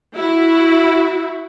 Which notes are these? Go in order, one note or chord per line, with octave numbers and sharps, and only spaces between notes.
E4 F#4